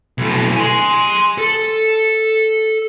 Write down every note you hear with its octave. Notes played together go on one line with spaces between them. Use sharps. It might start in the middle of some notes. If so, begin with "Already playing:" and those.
B1 A2
G#5 C6
A4